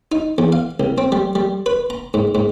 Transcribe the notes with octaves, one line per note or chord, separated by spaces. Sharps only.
D#4
E2
F5
C2
C4
G3
G3
B4
A#5
G#2
G#2